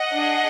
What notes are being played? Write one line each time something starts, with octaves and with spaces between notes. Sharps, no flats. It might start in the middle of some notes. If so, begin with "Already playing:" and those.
Already playing: D#5 F#5
D4 G#4